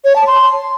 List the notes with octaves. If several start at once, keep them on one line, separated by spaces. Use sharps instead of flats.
C#5
A5
C6